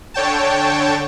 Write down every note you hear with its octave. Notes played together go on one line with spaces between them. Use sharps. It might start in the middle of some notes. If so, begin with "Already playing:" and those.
D3 C#5 G5 A5